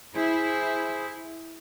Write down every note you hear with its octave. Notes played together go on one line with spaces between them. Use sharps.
E4 G#4 C5